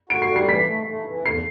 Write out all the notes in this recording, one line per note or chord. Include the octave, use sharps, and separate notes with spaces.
F#4 D7
C7
G3
C7
E3 B6
A3
A3
E3
E2 C7